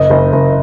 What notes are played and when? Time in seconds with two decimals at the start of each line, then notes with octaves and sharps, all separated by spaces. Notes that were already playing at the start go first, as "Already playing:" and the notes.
Already playing: F#1 D#5
0.10 F#1
0.33 F#1